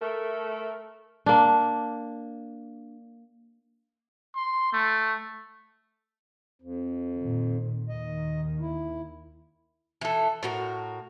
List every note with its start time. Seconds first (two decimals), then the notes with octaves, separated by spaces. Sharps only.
0.02 A3 A#4
1.26 A#3 D4
4.35 C6
4.72 A3
6.62 F2
7.19 A#2 D#3
7.89 D#2 D#3 D#5
8.60 E4
10.01 E3 A4
10.43 A2 F#4 A#4